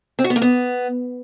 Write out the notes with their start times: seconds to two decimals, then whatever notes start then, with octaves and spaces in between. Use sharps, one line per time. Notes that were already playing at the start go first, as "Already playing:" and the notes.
0.19 C4
0.24 F#4
0.30 B3
0.36 A#3
0.42 B3